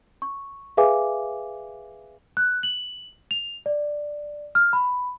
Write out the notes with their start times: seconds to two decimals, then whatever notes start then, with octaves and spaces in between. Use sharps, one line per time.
0.22 C#6
0.77 G#4 B4 E5 F5 G#5 D6
2.37 F#6
2.63 F#7
3.31 F7
3.66 D5
4.55 F6
4.73 B5